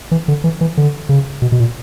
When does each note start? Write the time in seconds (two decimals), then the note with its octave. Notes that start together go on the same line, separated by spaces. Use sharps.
0.11 E3
0.28 D3
0.44 E3
0.61 E3
0.77 D3
1.09 C#3
1.42 B2
1.52 B2
1.59 A#2